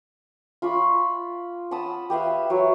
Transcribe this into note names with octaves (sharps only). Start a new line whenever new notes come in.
F4 B5 C#6 D6
F#5 A5 B5 D#6
G4 B4 E5 F5
F#3 E4 C#5